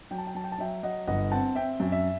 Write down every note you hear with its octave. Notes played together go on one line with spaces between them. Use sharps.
F#3 G5
A5
G5
F#3 A5
G5
A5
F#3 E5 G5
F#3 D#5 F#5
G1 D#5 F#5
C4 F#5 A5
C4 E5 G5
F#2
E5